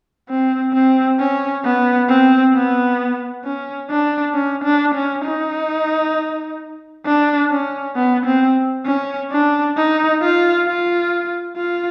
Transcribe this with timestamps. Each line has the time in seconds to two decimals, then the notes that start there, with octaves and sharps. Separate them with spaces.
0.29 C4
0.73 C4
1.19 C#4
1.64 B3
2.09 C4
2.54 B3
3.44 C#4
3.90 D4
4.34 C#4
4.64 D4
4.95 C#4
5.24 D#4
7.06 D4
7.51 C#4
7.96 B3
8.26 C4
8.86 C#4
9.32 D4
9.77 D#4
10.22 F4
10.66 F4
11.56 F4